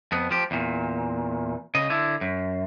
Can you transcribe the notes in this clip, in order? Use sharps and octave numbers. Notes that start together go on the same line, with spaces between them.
F2 B3
F3 G4
E2 A#2
C#3 D#5
D3 E4
F#2